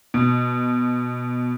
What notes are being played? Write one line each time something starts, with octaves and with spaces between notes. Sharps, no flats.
B2